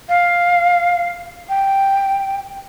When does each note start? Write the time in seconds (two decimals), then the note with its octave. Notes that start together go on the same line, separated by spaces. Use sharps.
0.09 F5
1.49 G5